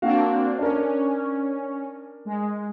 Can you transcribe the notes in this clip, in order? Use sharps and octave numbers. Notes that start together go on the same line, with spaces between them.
A#3 C4 D4 F#4 F5
C#4 D4 A#4
G#3